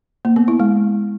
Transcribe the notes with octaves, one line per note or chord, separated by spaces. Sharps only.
A#3
B3
E4
G#3